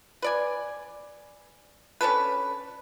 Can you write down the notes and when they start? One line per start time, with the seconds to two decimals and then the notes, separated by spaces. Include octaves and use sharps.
0.22 B4 D5 G#5
2.01 C#4 D4 A4 B4